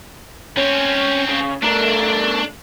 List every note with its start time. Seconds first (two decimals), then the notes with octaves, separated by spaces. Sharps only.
0.57 C4 C#4 C#5
1.29 C#3
1.62 A3 D4 A#4